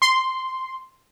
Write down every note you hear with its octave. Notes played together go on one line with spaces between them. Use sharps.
C6